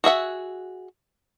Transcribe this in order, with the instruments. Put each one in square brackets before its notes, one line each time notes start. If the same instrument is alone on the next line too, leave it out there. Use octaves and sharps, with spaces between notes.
[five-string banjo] F#4 G#4 E5 F#5